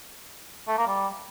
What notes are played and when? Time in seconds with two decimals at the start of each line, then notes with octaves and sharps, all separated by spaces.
0.68 A3
0.77 A#3
0.87 G3